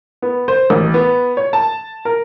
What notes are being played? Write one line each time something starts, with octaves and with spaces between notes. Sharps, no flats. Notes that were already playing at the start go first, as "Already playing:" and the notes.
B3
C5
A1
B3
C#5
A5
A#4